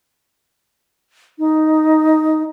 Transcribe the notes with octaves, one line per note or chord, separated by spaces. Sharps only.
D#4